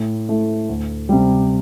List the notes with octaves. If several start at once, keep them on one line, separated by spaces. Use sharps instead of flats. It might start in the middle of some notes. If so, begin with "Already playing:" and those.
Already playing: A2
A3 E4
D2
C3 G3